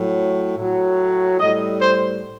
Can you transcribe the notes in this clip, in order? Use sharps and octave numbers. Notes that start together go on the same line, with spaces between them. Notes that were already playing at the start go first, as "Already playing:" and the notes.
Already playing: A2 F#3
A2 F#3
A2 G3 D#5
C5